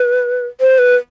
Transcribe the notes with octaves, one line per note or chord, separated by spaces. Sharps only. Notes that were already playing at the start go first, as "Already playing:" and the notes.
Already playing: B4
C5
B4